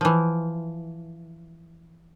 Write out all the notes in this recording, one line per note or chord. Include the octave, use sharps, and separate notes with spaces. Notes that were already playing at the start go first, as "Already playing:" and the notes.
E3 F3